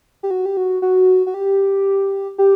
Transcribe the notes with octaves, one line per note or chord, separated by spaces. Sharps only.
G4
F#4
G4
F#4
F#4
F#4
G4
G4